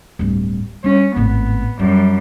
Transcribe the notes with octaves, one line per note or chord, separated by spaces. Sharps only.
D1 G2
G3 C#4
G#1 A2 B3
F#2 G3 E4